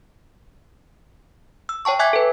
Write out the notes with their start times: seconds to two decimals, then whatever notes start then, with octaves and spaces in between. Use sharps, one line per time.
1.69 E6
1.85 C#5 G5 A5 C#6
1.99 E5 G#5 D6 F#6 G#6 B6
2.13 A4 B4